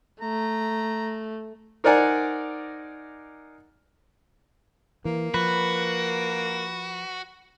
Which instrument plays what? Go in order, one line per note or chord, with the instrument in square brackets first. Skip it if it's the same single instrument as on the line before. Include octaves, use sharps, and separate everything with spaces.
[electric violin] A3 [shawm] A#5
[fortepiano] D#4 A#4 C5 D5 F#5 G#5
[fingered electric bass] E3 [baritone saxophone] A#3
[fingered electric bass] F3 [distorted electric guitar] F#4 [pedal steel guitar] B4